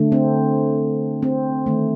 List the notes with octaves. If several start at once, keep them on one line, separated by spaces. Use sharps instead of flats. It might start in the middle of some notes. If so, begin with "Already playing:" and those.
Already playing: D3 A3
C4
C4
D#3 A3